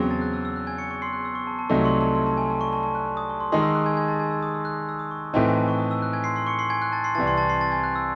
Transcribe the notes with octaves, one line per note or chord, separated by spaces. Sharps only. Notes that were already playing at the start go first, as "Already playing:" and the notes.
Already playing: E2 C#3 F#3 C4
A5 A6
F#6
E6
E6
F#6
G#5 G#6
C#6 C#7
C#6 C#7
C6 C7
F#6
E6
C#6
A5
A5
C2 C3 F#3 A3 D#4 C#6
C6
A5
C6
A5
G#5
A5
C#6
A5
A5
F#6
D#6
A5
C6
D#3 G#3 D#4 G#4 C6
E6
F#6
G#5 G#6
G#5 G#6
A5 A6
G#5 G#6
E6
D#6
E6
F#6
E6
D#6
C#6
A2 E3 C4 D#4 A5
G#5
A5
C#6
D#6
E6
F#6
G#5 G#6
C6 C7
C6 C7
C#6 C#7
C6 C7
G#5 G#6
F#6
A5 A6
C6 C7
C2 C3 E3 A5 A6
C6 C7
A5 A6
C6 C7
A5 A6
G#5 G#6
F#6
E6